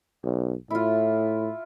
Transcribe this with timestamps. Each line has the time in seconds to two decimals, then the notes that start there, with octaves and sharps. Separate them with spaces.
0.23 B1
0.70 A2 E4 F4